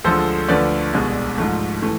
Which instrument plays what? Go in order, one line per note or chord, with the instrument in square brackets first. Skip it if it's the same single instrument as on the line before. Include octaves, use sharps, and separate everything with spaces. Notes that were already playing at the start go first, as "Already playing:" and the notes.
[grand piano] D2 D3 F3 G#3 A4 C5
D2 D3 F3 A3 B4 D5
C2 B2 G#3
G#2 F3 A3
E3 A3